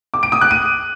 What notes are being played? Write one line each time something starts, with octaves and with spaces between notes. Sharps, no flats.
D6
D7
D#6
F#6
D#7